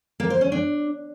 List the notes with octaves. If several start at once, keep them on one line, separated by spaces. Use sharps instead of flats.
A#3
C5
C#4
D4